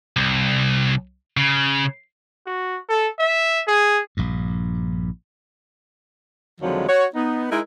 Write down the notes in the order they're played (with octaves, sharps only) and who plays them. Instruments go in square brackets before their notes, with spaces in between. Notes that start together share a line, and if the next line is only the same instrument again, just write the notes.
[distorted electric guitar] C2
C#3
[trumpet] F#4
A4
E5
G#4
[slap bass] A#1 G2
[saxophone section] F2 D3 D#3 F3 F#3 G#3
F#4 C#5
B3 D#4
G#3 D#4 E4 A#4